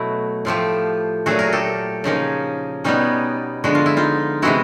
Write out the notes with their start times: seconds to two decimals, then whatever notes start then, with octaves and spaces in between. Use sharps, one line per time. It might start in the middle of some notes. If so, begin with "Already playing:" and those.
Already playing: B2 F#3 A3 E4 F#4
0.45 A2 F3 A3 F4 G4
1.26 A#2 F#3 A3 F#4 G#4
1.39 G#4 A#4
1.52 G4 A4
2.04 C#3 F3 A#3 C#4 D#4
2.84 B2 G3 B3 C#4 D#4
3.64 D3 F3 G#3 B3 F#4
3.75 F4
3.86 E4
3.97 D#4 F4
4.42 C3 E3 G#3 B3 E4 F#4